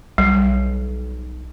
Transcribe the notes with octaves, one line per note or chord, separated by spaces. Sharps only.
B1 G3